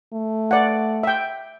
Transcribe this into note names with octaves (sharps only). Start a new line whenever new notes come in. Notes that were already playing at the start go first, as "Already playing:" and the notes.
A3
D5 F#5
E5 G5